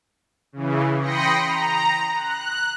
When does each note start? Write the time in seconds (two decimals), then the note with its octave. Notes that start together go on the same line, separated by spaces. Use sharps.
0.53 C#3 E3
1.00 G5 B5 C6 D#6 A#6 C#7
1.43 A#5
2.16 F#6